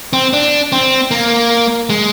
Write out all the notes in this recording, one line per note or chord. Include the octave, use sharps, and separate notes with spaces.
C4
D4
C4
A#3
G#3